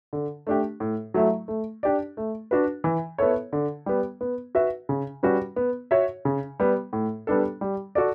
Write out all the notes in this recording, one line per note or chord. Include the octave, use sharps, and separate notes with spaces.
D3
A3 D4 G4
A2
F#3 A3 E4
A3
D4 G4 D5
A3
D4 F#4 B4
E3
B3 E4 A4 C#5
D3
G3 B3
B3
F#4 B4 E5
C#3
G3 C#4 F#4 B4
B3
F#4 C#5 E5
C#3
G3 B3
A2
G3 B3 D4 A4
G3
F#4 A4 D5